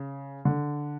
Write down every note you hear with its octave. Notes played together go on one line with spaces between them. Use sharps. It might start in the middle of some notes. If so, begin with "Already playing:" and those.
Already playing: C#3
D3